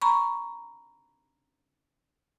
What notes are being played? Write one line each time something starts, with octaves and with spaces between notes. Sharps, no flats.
A#5 B5 C#6